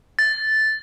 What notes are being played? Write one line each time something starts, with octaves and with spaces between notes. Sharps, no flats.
A6